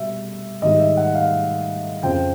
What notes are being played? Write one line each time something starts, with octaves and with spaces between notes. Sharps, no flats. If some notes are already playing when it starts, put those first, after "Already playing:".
Already playing: B2 G3 E5
G#2 D#3 G3 D#5
E5
F#5
F5
F2 C#3 F3 G5